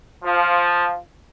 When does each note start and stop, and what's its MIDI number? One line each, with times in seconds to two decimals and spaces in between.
0.23 0.95 53